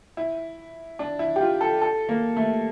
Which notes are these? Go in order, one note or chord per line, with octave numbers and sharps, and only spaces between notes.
E4
D4
E4
G4
F4
A4
A4
A#3
A3